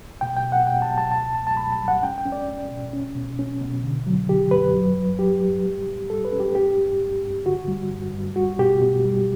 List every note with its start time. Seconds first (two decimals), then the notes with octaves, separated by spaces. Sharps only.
0.21 B2 G5
0.37 G5
0.44 B2
0.52 F#5
0.67 B2 G5
0.82 A5
0.89 B2
0.98 A5
1.12 C#2 A5
1.35 B2 A5
1.47 A5
1.57 B2 B5
1.72 A5
1.79 G3
1.88 F#5
2.02 C#4 G5
2.18 G5
2.25 C#4
2.32 D5
2.48 C#4
2.71 B2
2.93 C#4
3.16 B2
3.39 C#4
3.61 B2
3.83 D3
4.06 F#3
4.28 D3 G4
4.51 F#2 B4
4.75 F#3
4.96 G2
5.19 F#3 G4
5.42 G2
5.65 G3
5.87 A2
6.10 G3 A4
6.25 B4
6.32 C#4
6.40 G4
6.55 G2 G4
6.77 G2
7.01 G2
7.24 G2
7.46 D3 F#4
7.68 G3
7.91 G2
8.13 G2
8.36 G3 F#4
8.59 B2 G4
8.81 B2
9.04 G3